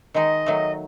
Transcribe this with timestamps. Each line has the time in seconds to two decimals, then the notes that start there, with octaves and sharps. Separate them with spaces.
0.14 D#3 G#3 D#4 D#5
0.46 D#3 F#3 A3